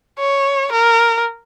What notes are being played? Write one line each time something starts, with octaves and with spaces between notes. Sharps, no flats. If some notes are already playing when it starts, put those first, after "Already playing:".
C#5
A#4